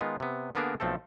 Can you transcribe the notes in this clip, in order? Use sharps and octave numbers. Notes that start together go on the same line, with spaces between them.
D#3 G#3 B3 F4
C3 B3
D3 A#3 B3 D4 G#4 A#4
B1 F3 A3 C4 A4